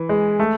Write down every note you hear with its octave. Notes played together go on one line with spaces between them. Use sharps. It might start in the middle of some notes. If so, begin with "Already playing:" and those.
Already playing: E3
G#3
A3